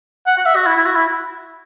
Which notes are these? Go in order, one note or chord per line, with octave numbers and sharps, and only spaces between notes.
F#5
F#5
E5
F#4
E4
E4
F#4
E4